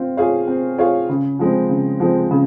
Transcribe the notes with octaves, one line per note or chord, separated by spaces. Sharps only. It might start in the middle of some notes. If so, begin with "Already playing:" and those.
Already playing: C4 F4 F5
F4 G#4 C#5 F5
C4
F4 G#4 C#5 F5
C#3
F3 G#3 C4
C#3
F3 G#3 C4
C#3